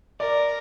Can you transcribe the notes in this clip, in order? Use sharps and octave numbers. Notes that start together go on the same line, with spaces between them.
A#4 D5